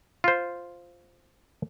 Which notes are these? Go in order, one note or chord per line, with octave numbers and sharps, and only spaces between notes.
F4 C5